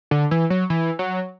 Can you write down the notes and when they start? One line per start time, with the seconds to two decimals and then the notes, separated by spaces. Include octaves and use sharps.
0.11 D3
0.31 E3
0.50 F#3
0.70 E3
0.99 F#3